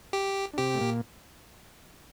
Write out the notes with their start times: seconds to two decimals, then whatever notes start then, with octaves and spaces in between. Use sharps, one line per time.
0.13 G4
0.53 D4
0.58 C3 C4 G4
0.74 A3
0.81 A#2 A#3